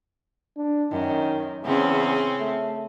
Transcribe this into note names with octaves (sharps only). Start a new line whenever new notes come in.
D4
F#2 D#3
E2 C#3 C4 C#4
A3